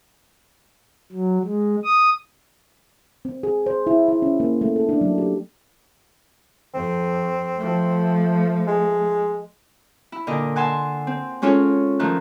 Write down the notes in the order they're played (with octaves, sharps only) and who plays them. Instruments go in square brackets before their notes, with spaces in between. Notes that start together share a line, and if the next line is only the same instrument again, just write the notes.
[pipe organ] F#3
G#3
D#6
[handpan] C4
G#4
C5
E4
E4
C#4
A#3
A3
A4
D4
F#3
G4
[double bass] F2 [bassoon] C4
[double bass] F3 A3
[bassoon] G#3
[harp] E4
A#2 D3 D#5
F#5 G#5 A5 C6 E6
C4
G#3 C#4 F4 A4 C#5
D#3 F3 A3 F#6